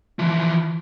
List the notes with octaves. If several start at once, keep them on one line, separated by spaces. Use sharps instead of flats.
E3 F3